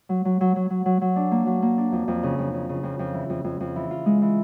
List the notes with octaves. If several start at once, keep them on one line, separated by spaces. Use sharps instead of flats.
F#3
F#3
F#3
F#3
F#3
F#3
F#3
D4
A#3
F#3
A#3
D4
F2
F2
C#3
F2
C#3
C#3
F2
F2
E3
F2
F2
F2
E3
F4
G#3
E3